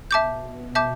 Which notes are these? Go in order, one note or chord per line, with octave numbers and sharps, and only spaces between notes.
B2 E5 A5 D6 G6
E5 A5 D6 G6